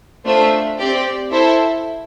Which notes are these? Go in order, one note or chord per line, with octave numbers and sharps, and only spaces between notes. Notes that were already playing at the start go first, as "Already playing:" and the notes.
A3 D4 F4 C5 E5
C4 G4 D5
E4 A4 C5 E5